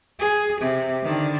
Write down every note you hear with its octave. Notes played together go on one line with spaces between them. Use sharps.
G#4
C3
D3 D#3